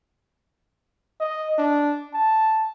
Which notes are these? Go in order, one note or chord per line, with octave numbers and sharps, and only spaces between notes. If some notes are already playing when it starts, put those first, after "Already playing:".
D#5
D4
A5